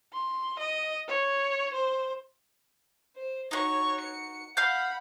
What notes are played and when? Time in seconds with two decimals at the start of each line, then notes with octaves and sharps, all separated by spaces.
0.14 C6
0.59 D#5
1.08 C#5
1.74 C5
3.16 C5
3.51 D#4 F#4 C#5 C#6
4.01 C#7
4.57 F5 F#5 B5 F6 G6